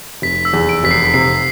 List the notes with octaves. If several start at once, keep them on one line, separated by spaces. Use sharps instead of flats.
F1 B6
E6
E2
D7
F1 B6
C7
B6
C3 C7